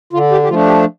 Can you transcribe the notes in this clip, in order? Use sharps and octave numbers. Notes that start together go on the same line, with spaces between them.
D3 F4
G4
G4
F3 A3 D4 F4
G4